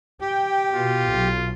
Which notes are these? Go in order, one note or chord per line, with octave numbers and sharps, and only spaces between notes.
G4 G5
B2 F4
B1